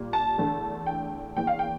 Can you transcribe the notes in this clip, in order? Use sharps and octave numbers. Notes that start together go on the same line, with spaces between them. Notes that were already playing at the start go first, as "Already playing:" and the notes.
Already playing: A#2 G3 A#3
A5
E2 D3 A3
G5
E2 E3 A#3 G5
F5
G5